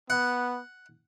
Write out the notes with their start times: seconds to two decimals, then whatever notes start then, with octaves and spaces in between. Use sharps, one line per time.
0.10 B3 F#5